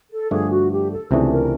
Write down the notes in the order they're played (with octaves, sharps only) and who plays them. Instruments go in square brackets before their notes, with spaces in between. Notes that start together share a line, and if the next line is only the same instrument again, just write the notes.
[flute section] A4
[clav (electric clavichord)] G2 D3 F3 A3 D4 [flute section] G#4
[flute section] F#4
G4
A4
[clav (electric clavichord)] C#2 C3 E3 A3 D4 [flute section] G#4
[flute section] A#4